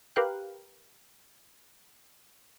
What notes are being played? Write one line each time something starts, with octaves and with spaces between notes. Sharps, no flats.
G4 A#4 B4 F5 G5 F#6